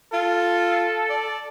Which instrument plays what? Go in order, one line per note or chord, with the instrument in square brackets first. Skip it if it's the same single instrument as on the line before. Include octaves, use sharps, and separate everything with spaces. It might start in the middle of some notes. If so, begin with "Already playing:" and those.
[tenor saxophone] F4 [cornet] A4
[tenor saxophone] D5